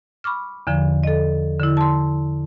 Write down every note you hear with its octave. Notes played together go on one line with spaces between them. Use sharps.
B5 C#6 D6 F6
E2 D3 F3
A4 D#5
D3 E4
A5 C6